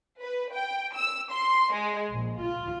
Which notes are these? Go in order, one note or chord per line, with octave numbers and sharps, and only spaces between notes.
B4
G5
E6
C6
G#3
A#1
F4